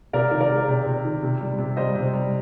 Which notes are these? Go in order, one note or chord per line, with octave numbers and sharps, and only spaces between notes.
C3 A#4 D5
D#3
A#4 D5
G#3
C3
C3
D#3
C3
G3
C3
G3 C5 D#5
C3
G3